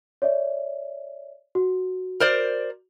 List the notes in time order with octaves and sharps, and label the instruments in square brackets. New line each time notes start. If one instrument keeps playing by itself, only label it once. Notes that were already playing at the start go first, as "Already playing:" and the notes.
[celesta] C#5 D5 E5
F#4
[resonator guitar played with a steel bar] A#4 C5 D5